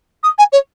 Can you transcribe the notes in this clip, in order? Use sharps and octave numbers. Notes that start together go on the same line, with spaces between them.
D#6
G#5
C#5